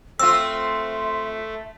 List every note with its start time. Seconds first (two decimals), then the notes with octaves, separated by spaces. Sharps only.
0.20 A3 C4 F4 E5 E6